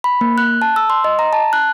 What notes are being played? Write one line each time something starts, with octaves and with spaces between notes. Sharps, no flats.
B5
A#3
F#6
A5
E6
C6
D#5
A#5
A5
F#6